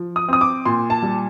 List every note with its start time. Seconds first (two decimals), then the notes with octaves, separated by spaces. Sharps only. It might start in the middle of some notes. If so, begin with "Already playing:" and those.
Already playing: F3
0.16 D#6
0.29 C4 D#6
0.41 D6
0.66 A#2 C6
0.90 A5
1.02 G3